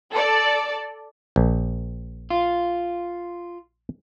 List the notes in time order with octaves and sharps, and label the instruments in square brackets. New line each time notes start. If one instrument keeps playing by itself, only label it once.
[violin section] A4 D5
[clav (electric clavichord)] A#1
[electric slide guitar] F4